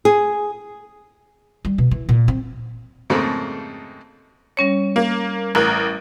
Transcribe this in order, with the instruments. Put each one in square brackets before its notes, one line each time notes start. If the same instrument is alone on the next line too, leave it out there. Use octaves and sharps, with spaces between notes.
[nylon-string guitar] G#4
[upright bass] G3
B2
E3
A#2
C4
[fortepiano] F2 G#2 C#3 A3 A#3 C4
[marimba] G3 C#4 C#5
[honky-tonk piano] A#3
[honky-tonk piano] A1 A#4 [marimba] F#6